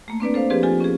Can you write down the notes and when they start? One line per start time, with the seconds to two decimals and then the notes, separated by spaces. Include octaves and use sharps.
0.08 A3 A#3
0.20 C4 D4 B4 D5
0.34 A4 C5 F5
0.50 F3 C4 G4 G#4 B4
0.63 F4 G4 A4 G#5
0.80 C#4 G#4